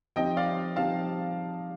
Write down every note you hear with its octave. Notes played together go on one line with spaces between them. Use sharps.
F3 C4 D#4 G4 D#5 G5
D5 F5
F3 C4 D#4 G4 F5 A5